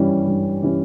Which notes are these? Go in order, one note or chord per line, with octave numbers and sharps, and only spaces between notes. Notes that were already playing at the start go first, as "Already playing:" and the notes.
Already playing: G2 E3 G3 C#4
G2
E3 G3 C#4